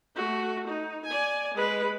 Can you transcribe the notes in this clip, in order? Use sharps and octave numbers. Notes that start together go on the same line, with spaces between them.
A3 F#4
D#4
D5 G#5
G#3 B4